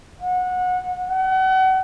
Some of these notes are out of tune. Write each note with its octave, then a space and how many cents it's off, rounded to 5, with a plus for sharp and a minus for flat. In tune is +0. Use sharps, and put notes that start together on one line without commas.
F#5 -20
F#5 +35